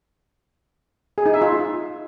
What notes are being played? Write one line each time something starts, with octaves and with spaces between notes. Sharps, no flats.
G#4
D#4
E5
F4